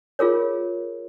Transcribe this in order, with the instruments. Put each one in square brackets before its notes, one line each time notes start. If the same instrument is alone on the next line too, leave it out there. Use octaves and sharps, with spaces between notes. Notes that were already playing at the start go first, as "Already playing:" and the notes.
[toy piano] F4 G#4 A#4 C#5